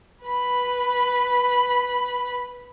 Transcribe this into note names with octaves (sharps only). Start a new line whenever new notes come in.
B4 B5